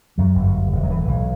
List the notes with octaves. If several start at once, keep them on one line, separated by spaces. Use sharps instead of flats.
F#2 F#3
G1
D2
E1
F#3
A2 E3
B1